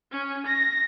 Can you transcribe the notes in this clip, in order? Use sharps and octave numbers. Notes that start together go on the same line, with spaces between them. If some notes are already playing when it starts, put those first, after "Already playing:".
C#4
A#6